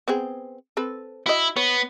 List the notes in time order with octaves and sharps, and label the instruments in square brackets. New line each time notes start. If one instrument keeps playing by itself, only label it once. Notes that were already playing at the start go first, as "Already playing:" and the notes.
[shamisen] B3 C4 G#4
C4 A4 B4
[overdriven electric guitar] E4 [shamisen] F#4 D#5
[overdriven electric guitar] B3 [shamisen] C#5